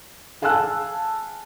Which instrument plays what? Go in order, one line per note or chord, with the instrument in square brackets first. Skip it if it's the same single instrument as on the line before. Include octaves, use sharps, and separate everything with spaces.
[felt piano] G#4 F5 G#5 A5 E6 F#6